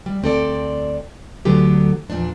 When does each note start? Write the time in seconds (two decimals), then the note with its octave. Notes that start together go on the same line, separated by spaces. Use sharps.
0.06 G3
0.22 D2 C4 A4 D5
1.45 D2 D3 F#3 B3 G4 A#5
2.10 E2 A#2 F3 D4